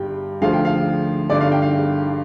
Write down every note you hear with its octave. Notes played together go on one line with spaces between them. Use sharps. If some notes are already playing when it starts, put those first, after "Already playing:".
Already playing: G1 G2 G3 G5
D2 D3 F3 F5
G5
F5
G1 G2 D3 D5
F5
G5
F5